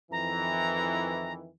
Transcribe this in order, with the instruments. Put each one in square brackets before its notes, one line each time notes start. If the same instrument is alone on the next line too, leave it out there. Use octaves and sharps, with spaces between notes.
[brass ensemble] F2 D#3 E3 [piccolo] A#5